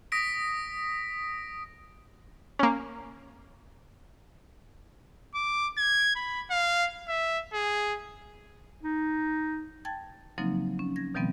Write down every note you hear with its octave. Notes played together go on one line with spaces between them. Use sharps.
D#6 A#6 B6 D7
A#3 C#4
D6
G#6
B5
F5
E5
G#4
D#4
G5 A5 G#6 A6
C#3 F3 F#3 A#3 C4 D#4
C#4
G#6 A#6
B2 D#3 F3 G3 B3 C4